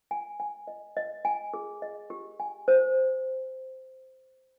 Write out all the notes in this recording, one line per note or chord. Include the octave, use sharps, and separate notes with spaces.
G#5
G#5
D#5
D#5
G#5
G#4
D#5
G4
G#5
C5